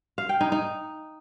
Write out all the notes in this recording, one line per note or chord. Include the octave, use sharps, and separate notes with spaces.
F5
G5
D#4
D#4